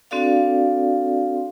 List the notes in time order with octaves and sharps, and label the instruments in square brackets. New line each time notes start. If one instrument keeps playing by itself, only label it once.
[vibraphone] C4 D4 F#4 A4 D5 F5